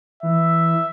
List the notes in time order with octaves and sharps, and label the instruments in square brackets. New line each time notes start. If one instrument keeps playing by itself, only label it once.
[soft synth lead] E3 [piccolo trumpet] E5